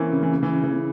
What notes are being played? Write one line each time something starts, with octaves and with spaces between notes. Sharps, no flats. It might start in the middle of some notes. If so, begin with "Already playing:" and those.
Already playing: E3 A#3 C4 C#4 E4
C#3
E3
C#3
E3
C#3
E3
C#3